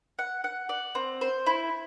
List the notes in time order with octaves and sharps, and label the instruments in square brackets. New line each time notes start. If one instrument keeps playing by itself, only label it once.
[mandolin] F#5
F#5
D5
C4
C5
E4